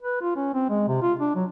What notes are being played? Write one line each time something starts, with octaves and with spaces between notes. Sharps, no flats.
B4
F4
C#4
C4
G#3
C3
F4
D4
F#3